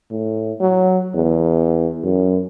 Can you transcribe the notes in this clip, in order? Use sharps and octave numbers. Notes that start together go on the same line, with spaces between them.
A2
F#3
E2
F#2